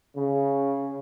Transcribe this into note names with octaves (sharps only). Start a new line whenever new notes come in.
C#3